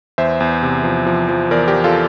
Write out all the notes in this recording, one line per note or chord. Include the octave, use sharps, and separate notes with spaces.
E2 C5 E5
E2
C3
F3
F3
F3
E2 A#4 D5
G4 A#4
F3
F4 A4